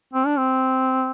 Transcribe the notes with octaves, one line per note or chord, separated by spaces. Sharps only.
C4
D4
C4